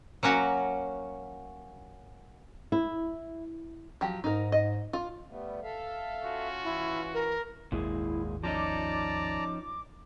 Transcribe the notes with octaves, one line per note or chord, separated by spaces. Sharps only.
F#3 A#3 C#4 F#4
E4
F3 F#3 G4
G#2 D#4 A#4
D#5
F4
G3 A3 B3
A4 E5 F5
C#4 F4 F#4
E3 E4
A#4
G#1 D#2 A#2 G#3 E4
F3 C#4 D#4 D5 A5 A#5 D6